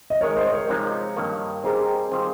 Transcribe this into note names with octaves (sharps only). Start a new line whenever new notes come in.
D#5
F2 D#3 G#3 A#4 C#5
C5 D#5
A#4 C#5
C3 F3 G#3 D#4
G2 D#3 A#3
G3 C4 D#4 G#4 A#4 C5
D#3 G3 C4 F4